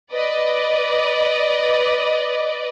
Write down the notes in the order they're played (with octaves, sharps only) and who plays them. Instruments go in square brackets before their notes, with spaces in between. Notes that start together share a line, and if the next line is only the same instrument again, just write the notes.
[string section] B4 D5 D#5